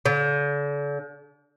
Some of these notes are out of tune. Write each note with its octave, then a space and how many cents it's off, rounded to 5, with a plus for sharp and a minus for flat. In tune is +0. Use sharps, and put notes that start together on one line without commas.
D3 -40